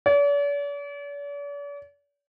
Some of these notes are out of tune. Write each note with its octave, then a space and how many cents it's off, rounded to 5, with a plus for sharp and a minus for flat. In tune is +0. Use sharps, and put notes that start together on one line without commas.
D5 -45